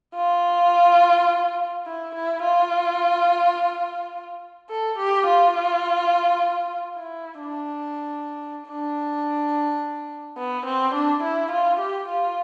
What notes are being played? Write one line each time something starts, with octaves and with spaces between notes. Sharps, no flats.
F4
E4
E4
F4
A4
G4
F4
E4
D4
D4
B3
C4
D4
E4
F4
G4
F4